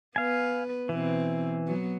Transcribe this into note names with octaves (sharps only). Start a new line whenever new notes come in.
B3 B4 F5 G#5
B2 E3 C4
F#3 B3